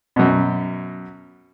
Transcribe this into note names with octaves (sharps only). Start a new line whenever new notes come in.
F#2 B2